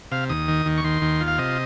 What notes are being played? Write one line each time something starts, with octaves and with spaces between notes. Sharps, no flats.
C3 F5
D#2 D#6
D#3
D#2
C#6
D#3 C6
D#2
F4
F5
C3 D#5